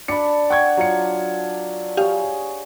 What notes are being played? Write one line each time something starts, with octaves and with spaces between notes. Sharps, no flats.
D4 D5 A5 B5 C#7
F#5 G5 C#6 G#6
F#3 F4 C#7
G4 G#4 C#5 F5